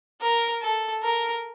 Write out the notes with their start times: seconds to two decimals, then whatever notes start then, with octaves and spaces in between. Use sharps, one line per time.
0.21 A#4
0.62 A4
1.03 A#4